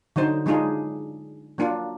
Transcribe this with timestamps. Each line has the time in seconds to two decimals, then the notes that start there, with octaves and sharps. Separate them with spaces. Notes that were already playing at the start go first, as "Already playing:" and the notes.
0.16 D3 F#3 D#4 C5
0.46 F#3 G#3 D4 D#4 F4 G#4
1.58 F#3 A#3 D4 F4